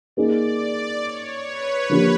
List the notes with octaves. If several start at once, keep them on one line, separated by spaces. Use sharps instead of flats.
A#3 D#4 G#4 D5
C#5
B4
D3 F3 A#3 D4 G4